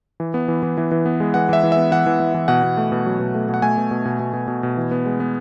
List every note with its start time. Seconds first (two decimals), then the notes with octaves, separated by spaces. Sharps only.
0.20 E3
0.34 B3
0.48 E3
0.63 E3
0.78 E3
0.91 E3
1.06 B3
1.20 G#3
1.34 E3 F#5
1.49 E3 E5
1.63 E3
1.72 B3 E5
1.91 E3 F#5
2.06 E3
2.20 E3
2.34 E3
2.48 B2 F#5
2.63 B2
2.77 A3
2.92 B2
3.06 F#3
3.19 B2
3.35 A3
3.49 B2 F#5
3.62 A3 G#5
3.78 B2
3.91 B2
4.05 B2
4.19 B2
4.33 B2
4.48 B2
4.63 B2
4.77 E3
4.91 B3
5.06 G#3
5.20 B3